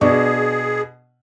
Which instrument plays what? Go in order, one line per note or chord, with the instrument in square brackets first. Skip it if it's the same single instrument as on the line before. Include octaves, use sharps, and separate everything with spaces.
[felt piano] B2 D4 C#6 [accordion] G#4